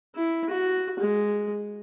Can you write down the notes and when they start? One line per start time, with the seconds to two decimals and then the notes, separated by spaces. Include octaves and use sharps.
0.16 E4
0.49 F#4
1.00 G#3